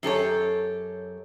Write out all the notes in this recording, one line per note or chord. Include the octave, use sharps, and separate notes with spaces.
F#2 G4 A4 C#5